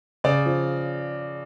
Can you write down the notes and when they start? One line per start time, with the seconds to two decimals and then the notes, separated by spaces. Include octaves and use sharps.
0.24 C#3 D5 D6
0.46 F3